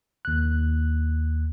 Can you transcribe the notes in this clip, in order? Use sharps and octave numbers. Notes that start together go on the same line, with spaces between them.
D#2 F#6